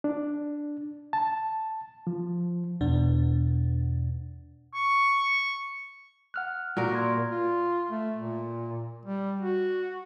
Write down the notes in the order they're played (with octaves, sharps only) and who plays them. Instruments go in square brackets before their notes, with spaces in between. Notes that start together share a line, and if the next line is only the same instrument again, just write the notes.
[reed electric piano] D4
A5
F3
[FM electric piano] E2 B2 D4
[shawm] C#6
[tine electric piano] F#5 F6 F#6
[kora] A#2 F#4 A#4
[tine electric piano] D5 C6 G#6
[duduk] F4
A3
A#2
G3
F#4